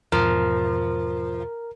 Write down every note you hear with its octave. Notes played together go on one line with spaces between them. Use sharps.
E2 G#2 B2 F3 A#4